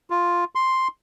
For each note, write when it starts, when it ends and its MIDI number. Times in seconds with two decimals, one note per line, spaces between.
0.10 0.44 65
0.55 0.88 84